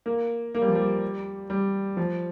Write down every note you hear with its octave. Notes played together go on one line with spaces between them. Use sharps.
A#3
A#3
G3
F3
G3
G3
F3